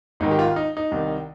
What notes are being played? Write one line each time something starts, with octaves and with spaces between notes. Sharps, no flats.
G#1 G#2 D#3 D#4
G4
F4
D#4
D#4
C2 C3 D#3